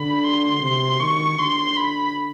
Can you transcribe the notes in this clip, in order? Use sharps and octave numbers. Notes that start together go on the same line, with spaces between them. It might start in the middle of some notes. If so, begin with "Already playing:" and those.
Already playing: D3 B5
C6
C3
D#3 C#6
D3 C6
B5